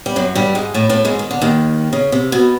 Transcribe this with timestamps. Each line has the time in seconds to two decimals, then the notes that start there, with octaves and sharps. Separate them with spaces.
0.06 G3
0.16 F#2 F#3
0.35 G2 G3
0.55 G#2 G#3
0.74 A2 A3
0.89 A2 A3
1.05 G#2 G#3
1.19 D#3
1.31 D3
1.42 D#2 D#3
1.93 C#3
2.12 C3
2.32 B2